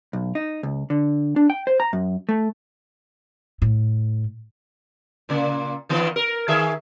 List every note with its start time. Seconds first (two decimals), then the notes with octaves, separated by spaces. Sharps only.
0.13 B1
0.35 D#4
0.63 C#2
0.90 D3
1.36 D4
1.50 G5
1.67 C5
1.80 A#5
1.93 F#2
2.29 A3
3.62 A2
5.29 A#2 C#3 A#3
5.89 D#3 E3 B3
6.16 A#4
6.48 D#3 G#4 E5